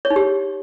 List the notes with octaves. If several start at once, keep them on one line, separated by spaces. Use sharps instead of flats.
C#5
D#4
G4